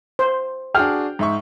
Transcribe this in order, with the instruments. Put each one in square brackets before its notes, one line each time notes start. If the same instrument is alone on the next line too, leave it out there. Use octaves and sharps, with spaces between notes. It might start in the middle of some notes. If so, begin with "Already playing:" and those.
[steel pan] C5
[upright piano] D4 F#4 G#4 [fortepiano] G5 F6
[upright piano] G#2 E5 C#6